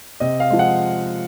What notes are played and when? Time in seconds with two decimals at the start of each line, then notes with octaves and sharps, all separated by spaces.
0.20 C3 D#5
0.40 F5
0.51 F3 G#3
0.59 F#5